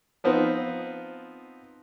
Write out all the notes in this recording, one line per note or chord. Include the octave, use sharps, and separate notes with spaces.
F3 B3 C4 D#4